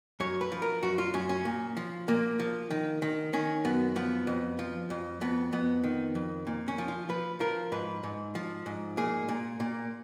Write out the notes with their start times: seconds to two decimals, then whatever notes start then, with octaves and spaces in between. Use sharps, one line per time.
0.20 F#2 C#5
0.41 B4
0.52 F3
0.62 A#4
0.83 F#2 F#4
0.98 F4
1.14 F#2 C#4
1.29 C#4
1.45 A#2
1.77 F3
2.08 A#2 A#3
2.39 F3
2.71 D#3
3.02 D#3
3.33 D#3 C#4
3.65 F#2 B3
3.96 F3 B3
4.27 F2
4.59 F3
4.90 F2
5.21 F2 B3
5.52 F2 B3
5.84 D#3
6.15 F2
6.47 A#2
6.68 C#4
6.78 F3
6.88 F4
7.09 F3 B4
7.40 F3 A#4
7.72 G#2 B4
8.03 G#2
8.35 F3
8.66 G#2
8.97 A#2 G#4
9.29 A#2
9.60 A#2